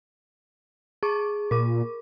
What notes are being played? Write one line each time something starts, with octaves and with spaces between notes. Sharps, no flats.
G#4 C#6 D6
A#2 A#4 D6